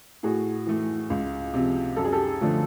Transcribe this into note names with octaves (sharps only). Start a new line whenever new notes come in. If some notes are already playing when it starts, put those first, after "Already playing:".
A2 F#4 G#4
E3 A3
C#2
C3 F3
F#2 A4
G#4
G4 A4
D3 F3 A3